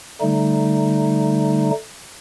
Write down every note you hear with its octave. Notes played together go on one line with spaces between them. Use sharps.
D3 G3 A3 D#4